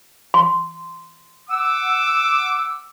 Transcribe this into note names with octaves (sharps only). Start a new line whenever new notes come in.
C6
F#5 D6 E6